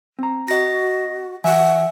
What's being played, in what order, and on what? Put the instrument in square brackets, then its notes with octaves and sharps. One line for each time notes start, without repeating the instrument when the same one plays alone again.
[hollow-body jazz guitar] C4 A#5
[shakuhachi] F#4 [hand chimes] D#5 A#6
[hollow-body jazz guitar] E3 [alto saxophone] E5 [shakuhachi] F#5 [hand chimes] G#5